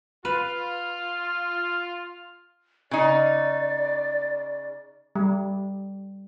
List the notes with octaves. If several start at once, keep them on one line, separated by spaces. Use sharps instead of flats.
F4 B4 F6
C#3 D#4 D5
G3